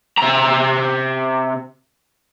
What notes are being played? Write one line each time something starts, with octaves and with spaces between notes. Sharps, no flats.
C3 A#5